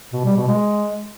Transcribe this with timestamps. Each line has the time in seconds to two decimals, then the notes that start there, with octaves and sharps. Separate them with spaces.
0.13 B2
0.25 G3
0.36 B2
0.48 G#3